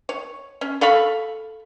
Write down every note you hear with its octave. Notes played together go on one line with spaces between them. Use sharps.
C#5
C#4
A4 F5 B5 C#6